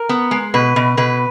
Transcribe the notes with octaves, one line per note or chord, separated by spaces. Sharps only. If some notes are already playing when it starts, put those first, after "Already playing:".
Already playing: A#4
B3
G#3
B2 B4
B2
B2 B4